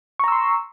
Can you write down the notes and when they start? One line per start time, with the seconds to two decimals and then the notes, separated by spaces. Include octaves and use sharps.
0.20 C#6
0.24 A#5
0.28 E6
0.32 C6